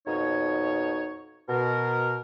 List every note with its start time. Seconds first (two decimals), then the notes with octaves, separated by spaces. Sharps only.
0.07 F2 B2 D#4 C#5
1.49 B2 A#4